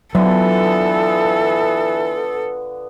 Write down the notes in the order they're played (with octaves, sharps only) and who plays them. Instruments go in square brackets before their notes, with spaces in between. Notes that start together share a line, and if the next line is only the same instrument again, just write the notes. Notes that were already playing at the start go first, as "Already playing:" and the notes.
[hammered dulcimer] D3 B3 F4 [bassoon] E3 [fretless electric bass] F#3 [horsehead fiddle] A4